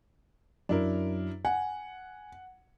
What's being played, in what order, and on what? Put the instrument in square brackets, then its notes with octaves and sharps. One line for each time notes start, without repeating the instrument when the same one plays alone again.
[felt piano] F#2 [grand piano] D4 E4 A#4
[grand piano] F#5 [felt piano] G#5